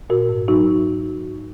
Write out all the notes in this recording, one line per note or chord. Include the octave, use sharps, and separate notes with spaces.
A#2 F#4 A#4
G#2
F#3 D#4 F#4